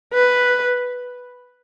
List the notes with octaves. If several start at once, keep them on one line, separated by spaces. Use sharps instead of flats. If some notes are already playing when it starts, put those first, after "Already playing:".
B4